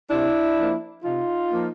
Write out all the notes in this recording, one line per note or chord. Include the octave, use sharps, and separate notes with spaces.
C3 D4 E4
F3 A#3
C3 D#4 F4
F3 A#3